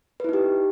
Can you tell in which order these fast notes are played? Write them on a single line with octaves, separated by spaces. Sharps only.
B4 E4 D#4 G4